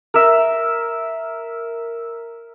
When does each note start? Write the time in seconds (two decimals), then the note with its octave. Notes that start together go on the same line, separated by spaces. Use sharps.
0.14 A#4 E5